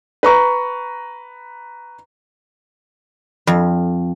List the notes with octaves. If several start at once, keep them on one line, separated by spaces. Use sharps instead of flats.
B4 A#5 C#6
F2